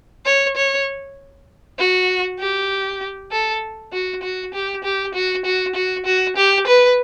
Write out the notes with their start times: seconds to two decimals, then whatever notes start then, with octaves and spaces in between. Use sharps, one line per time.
0.25 C#5
0.56 C#5
1.78 F#4
2.39 G4
3.31 A4
3.92 F#4
4.22 F#4
4.53 G4
4.84 G4
5.14 F#4
5.45 F#4
5.75 F#4
6.05 F#4
6.36 G4
6.66 B4